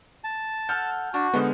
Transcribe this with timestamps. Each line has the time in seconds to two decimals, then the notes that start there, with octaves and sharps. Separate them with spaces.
0.24 A5
0.69 A4 F#5 F6 G6
1.14 D4 F#4
1.34 D3 G#3 B3 D#4 C5 F#5